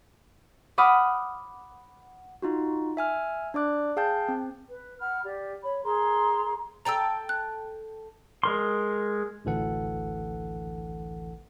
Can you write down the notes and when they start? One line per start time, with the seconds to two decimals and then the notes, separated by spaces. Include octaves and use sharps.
0.78 F#5 B5 D6 D#6 F6
2.42 D#4 F4 F#4
2.97 E5 G#5 F6
3.54 D4 D5 D6 F#6
3.97 G#4 F5 G5 A5 G6
4.28 C4
4.69 B4
5.00 F#5 B5 F6
5.25 G4 D5
5.62 C#5 B5
5.83 G#4 A#4 A#5 C6
6.85 A4 G5 A5 A#5 E6
7.29 F#6
8.44 G#3 A#4 C6
9.45 A1 D2 E3 A4 F#5